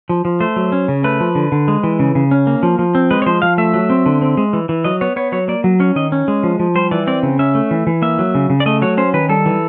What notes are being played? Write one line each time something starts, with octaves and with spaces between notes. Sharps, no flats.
F3
F3
A3 C5
F#3
C#4
C#3
A3 B4
F3
D3
D3
G#3
E3
C#3
C#3
C#4
A#3
F3
F3
C4
G#3 B4
C#5
F3 C5
F3 F5
A3 E5
F#3
C4
D3
C4
G#3
E3
E3
F#3 D#5
B3 C#5
B3 C#5
F#3 C#5
A#3 D5
F#3
C#4 C#5
D#3 D#5
C#4
G#3
F3
F3
G3 C5
E3 D5
C4 D5
C#3
C#4 E5
A3
E3
E3
A#3 E5
F#3
C#3
C#3
D5
A3 D#5
F#3 C#5
C#4 C5
D#3 B4
G3 A4
E3